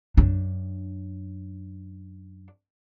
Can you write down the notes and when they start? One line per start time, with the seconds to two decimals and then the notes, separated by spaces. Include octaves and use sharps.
0.17 F#2 D4